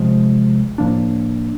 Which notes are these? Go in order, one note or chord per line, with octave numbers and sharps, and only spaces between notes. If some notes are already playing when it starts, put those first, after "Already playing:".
Already playing: C3 F3 G#3
A2 F3 A#3 D4